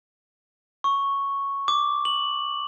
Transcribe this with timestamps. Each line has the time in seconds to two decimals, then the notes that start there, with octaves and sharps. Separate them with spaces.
0.84 C#6
1.68 D6
2.05 F#7